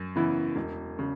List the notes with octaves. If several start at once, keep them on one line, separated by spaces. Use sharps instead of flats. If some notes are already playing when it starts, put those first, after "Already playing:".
Already playing: F#2
C#3 E3 B3 E4
E1
C#3